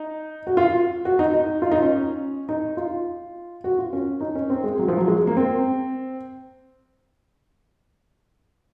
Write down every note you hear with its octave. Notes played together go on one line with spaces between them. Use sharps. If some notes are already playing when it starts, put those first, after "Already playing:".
Already playing: D#4
F#4
F4
F#4
D#4
D#4
F4
D#4
C#4
D#4
F4
F#4
F4
C#4
D#4
C#4
C4
G#3
F#3
F3
F#3
G#3
A#3
C4